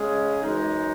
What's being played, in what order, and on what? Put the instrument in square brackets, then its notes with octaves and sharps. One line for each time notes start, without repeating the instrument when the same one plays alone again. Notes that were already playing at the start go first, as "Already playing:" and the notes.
Already playing: [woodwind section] C#3 G#3 C#4 G#4
F#2 E3 G#3 D#4